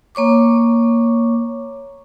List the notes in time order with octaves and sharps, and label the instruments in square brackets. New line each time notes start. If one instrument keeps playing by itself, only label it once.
[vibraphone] A#3 C#5 C#6 D6